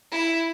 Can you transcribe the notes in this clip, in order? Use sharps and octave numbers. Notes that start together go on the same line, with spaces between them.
E4